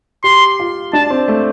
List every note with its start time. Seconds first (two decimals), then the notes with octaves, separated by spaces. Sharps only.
0.24 G4 C6
0.59 F4
0.93 D4 A5
1.10 C4
1.28 A3